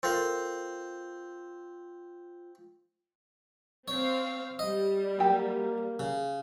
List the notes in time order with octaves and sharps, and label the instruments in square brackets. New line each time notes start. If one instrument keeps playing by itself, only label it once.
[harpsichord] C4 F5 [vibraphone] F4 [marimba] A4 A#4
[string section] C4 F5 [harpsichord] C#5
[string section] G3 [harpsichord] D#5
[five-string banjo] F#3 G4 [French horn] A#3
[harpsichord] C#3